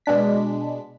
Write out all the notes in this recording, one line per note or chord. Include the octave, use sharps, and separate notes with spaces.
B2 G#3 D4 B6